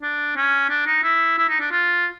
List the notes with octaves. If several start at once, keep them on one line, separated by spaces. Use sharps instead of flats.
D4
C#4
D4
D#4
E4
E4
D#4
D4
F4